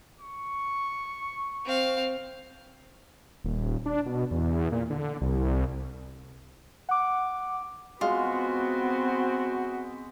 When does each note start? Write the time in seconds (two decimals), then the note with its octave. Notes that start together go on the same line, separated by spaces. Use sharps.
0.21 C#6
1.65 C4 F5
3.44 D#1
3.86 D4
4.06 B2
4.31 E2
4.72 A#2
4.90 D3
5.21 C2
6.89 F#5 D6
8.01 G#3 B3 C4 F4 F#4